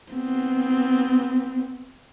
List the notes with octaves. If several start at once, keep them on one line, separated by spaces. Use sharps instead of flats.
B3 C4